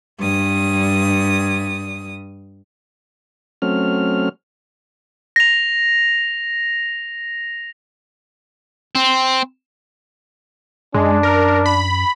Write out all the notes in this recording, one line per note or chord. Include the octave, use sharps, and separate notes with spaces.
G2 D#6
F#3 A3 C4 C#4 F6
A#6 F7
C4
F#2 G#3 D4
A#4
B5